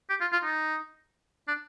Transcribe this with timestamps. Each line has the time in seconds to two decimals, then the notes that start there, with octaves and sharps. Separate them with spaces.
0.10 G4
0.21 F4
0.32 F4
0.44 D#4
1.48 D4